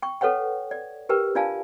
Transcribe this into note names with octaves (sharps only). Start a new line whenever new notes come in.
G5 C#6
A4 B4 C#5 F#5 G5
D5
G4 A#4 B4 G5
D4 F4 D5 F5 G#5 A5